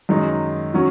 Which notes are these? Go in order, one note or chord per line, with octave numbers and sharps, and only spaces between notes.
F#2 D#3 G#3 D#4
D#3 F#3 C#4